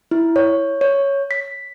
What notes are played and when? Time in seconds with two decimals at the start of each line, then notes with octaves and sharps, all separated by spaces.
0.11 E4
0.36 C#5
0.81 C#5
1.31 B6